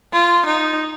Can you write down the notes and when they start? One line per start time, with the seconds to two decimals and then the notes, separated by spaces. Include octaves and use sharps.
0.13 F4
0.46 D#4